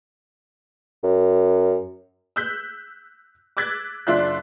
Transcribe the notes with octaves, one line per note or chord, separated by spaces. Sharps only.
F#2
E6 F#6 G6 B6
D6 E6 F#6 G#6 A6 B6
F#1 D4 F4 E5 F#6